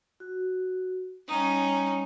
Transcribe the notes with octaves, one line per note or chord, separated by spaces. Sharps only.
F#4
G3 C#4 D#4 D#6